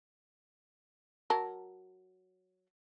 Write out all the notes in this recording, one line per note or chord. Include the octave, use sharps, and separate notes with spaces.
F#3 A#4 A5